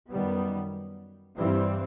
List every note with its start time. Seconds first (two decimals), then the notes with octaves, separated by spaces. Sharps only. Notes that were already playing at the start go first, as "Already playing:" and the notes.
0.10 F#2 D#3 G3 B3
1.36 G2 E3 G3 C4